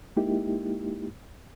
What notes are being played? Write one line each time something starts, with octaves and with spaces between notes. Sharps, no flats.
G#3 A#3 D#4 E4 G4